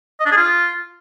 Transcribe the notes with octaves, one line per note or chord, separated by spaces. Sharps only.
D#5
D4
G#4
F4